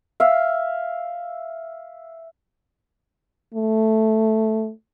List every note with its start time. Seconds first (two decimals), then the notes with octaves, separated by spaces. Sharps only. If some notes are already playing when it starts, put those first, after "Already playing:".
0.20 E5 F5
3.54 A3